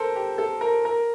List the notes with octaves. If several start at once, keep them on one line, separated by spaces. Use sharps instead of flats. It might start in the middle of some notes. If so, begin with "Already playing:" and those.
Already playing: A4 A#4 C5
G4
A4
A#4
A#4